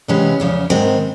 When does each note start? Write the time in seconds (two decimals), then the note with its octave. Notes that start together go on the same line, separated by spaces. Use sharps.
0.08 C3 E3 G#3 B3 C#4
0.40 E2 C#3 F3
0.70 G#2 D#3 G#3 B3 C4